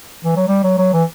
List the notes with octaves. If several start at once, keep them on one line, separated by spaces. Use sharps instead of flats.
E3
F#3
G3
F#3
F#3
E3